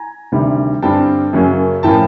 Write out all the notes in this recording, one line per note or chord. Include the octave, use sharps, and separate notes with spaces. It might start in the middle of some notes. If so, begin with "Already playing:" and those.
Already playing: G#5 A#5
D2 C3 D#3 G3
G2 D3 G3 C4 G5 A5
F#2 C#3 F#3 A#3 C#4
A2 F3 A#3 C#4 G5 A5